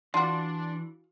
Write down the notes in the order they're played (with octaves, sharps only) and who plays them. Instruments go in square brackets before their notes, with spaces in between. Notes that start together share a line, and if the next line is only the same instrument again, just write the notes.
[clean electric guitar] E3 [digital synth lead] D4 [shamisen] F4 F#4 [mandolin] C6